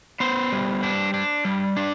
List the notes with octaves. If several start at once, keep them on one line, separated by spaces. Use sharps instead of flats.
B3 C5
G3
D4
D4
G3
D4